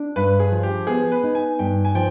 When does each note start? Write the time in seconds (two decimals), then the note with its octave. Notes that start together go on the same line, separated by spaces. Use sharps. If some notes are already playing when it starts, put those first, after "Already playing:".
Already playing: D4
0.16 G2 B4
0.40 G#4
0.52 F3
0.63 G4
0.87 B3 G#4
1.12 B4
1.23 D#4
1.35 G#5
1.59 G2 G5
1.85 G#5
1.95 F3 G5